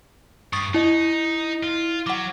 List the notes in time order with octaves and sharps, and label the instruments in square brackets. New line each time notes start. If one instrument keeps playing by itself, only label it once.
[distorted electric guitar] G2 [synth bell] C#6 D#6 A6
[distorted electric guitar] D#4 [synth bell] E4 D#5
[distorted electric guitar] F4
[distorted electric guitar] F#3 [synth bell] F#5 D6